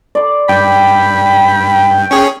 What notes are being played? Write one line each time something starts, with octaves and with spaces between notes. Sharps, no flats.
D5 C6
G2 G5 B5
C#4 G#4 C#5